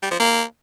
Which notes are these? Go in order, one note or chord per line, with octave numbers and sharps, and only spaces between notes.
G3
F3
A#3